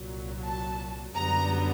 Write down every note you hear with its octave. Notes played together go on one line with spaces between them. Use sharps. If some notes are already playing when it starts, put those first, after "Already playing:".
Already playing: C2 A#2 F#3
A5
F#2 D3 G3 B3 A#5